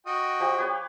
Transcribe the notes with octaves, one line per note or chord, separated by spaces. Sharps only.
F#4 D#5 G5
F3 G4
G4 B4 C#5